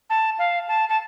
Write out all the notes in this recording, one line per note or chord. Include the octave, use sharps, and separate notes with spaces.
A5
F5
A5
A5